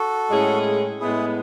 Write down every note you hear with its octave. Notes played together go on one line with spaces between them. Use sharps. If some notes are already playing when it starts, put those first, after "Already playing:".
Already playing: F#4 A4
A2 G#3 C#4 G#4
A2 G#3 B3 E4 G#4